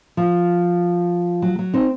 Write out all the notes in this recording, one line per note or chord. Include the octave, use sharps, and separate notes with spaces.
F3
F#3
F#3
C4 D#4